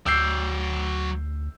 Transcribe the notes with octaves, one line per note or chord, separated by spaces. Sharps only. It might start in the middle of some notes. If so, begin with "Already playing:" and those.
D2 F#3 D5 E6 G6 C7